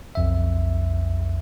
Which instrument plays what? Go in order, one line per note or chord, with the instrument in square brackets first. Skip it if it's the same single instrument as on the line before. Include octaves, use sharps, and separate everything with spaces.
[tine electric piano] B1 F2 E5